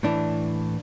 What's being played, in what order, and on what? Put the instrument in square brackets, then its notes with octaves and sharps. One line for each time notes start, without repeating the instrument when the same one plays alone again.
[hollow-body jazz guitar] A2 E3 D4